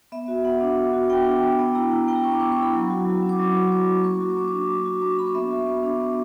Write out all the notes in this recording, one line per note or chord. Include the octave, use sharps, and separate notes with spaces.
B3 E5
F#4
B3 F#5
D4
B3
F#4
B3 G5
D4
B3
B3
E4 A#5
E4
B3 G5
A#5
B3 C#6
D6
E4 C#6
C#6
E4
B5
F#3
F#4
F#3
C#4
D6
F#3 C#6
F#4
F#3 D6
C#4
A#3 C#6
F#4
D6
A#3 C#6
D4 D6
A#3
F#4
A#3 D6
C#6
D4 B5
C#6
B3 E5
F#4
B3
D4
B3